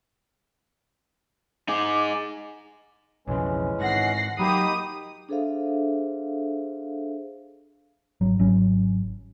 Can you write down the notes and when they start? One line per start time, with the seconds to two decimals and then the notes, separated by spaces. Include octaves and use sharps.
1.68 D#4 G#4 D6
3.28 B1 F2 C#3 E3 G#3 C#4
3.80 G#2 D#3 F#5 A#6 C7
4.39 F#3 A#3 D#4 G4 B5 D#6
5.29 D4 G#4 A4 C5 E5 F5
8.21 G#1 F#3
8.39 G#1 F#3 C#4